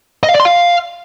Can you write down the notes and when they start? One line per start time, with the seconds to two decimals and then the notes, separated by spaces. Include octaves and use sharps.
0.23 D#5
0.29 F5
0.34 D5
0.40 C6
0.45 F5